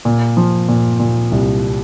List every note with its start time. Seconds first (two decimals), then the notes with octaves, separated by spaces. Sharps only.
0.05 A#2
0.37 F3
0.68 A#2
1.00 A#2
1.31 C2